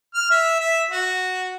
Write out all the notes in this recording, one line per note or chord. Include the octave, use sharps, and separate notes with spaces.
F6
E5
E5
F#4